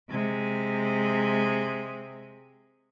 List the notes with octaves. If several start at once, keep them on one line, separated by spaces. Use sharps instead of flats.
C3 G#3